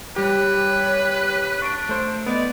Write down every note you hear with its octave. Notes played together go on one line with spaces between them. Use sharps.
G3 G4 B4 C#5
D4 C#6 D7
A3 C5
B3 D5 D#5